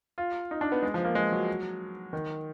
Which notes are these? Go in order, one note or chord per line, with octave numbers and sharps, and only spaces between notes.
F4
D#4
D4
B3
G#3
F3
A#3
G#3
F#3
D#3